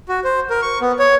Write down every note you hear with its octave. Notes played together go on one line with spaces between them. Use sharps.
F#4
C5
A#4
C#6
B3
C#5